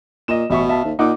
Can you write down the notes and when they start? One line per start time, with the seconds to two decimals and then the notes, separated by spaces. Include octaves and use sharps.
0.28 A#2 D#5 E7
0.50 A1 B2 E5 C#6
0.69 E5 F5 A5
0.85 D#2
0.99 A#2 D#4 F#5 D6